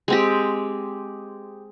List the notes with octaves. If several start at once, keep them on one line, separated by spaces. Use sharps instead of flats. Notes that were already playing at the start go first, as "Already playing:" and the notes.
G#3 C4 G4